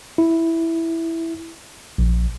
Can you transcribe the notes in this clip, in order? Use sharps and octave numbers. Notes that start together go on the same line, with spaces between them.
E4
A#1